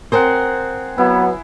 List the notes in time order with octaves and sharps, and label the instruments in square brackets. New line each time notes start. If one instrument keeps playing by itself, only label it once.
[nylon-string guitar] C4 A#4 C5 [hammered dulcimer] G#4 F#5
[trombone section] F#3 B3 [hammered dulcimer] E4